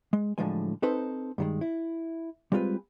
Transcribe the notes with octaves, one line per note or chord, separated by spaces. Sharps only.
G#3
A2 D3 F3 F#3 G#3 G#5
C4 D#4 A4 B4 C5
G2 D#3 G#3
E4
G3 G#3 C4 F4 A#4 B4